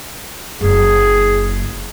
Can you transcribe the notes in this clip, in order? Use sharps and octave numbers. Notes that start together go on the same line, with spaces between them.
F#1 F#2 G#4